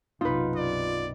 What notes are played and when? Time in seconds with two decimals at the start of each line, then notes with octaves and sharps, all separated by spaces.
0.21 B1 F#2 C3 D#4 F4 B4
0.56 D5